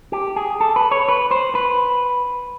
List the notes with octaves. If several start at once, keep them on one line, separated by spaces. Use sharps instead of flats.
G4
G#4
A4
B4
C#5
B4
C5
B4